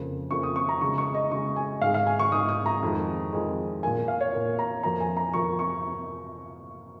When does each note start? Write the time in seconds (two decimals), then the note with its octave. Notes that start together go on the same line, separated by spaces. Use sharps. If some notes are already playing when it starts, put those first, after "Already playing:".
Already playing: F2 C#3 A#3
0.31 F2 C#3 A#3 C#6
0.43 D#6
0.56 C#6
0.69 A#5
0.81 C#3 G#3 C#6
0.98 C#6
1.14 D#5
1.31 C#3 G#3 C#6
1.56 G#5
1.81 G#2 F5
1.86 G#3
1.94 F5
2.07 G#5
2.19 C#6
2.32 G#2 G#3 D#6
2.49 D#6
2.66 A#5
2.83 F2 D#3 G#3
3.33 F2 D#3 G#3
3.83 A#2 A#3 G#5
4.08 F5
4.21 C#5
4.33 A#2 A#3
4.59 A#5
4.83 F2 F3 A#3 A#5
5.00 G#5
5.17 A#5
5.33 F2 F3 A#3 C#6
5.59 C#6